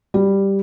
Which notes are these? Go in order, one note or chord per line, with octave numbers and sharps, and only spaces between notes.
G3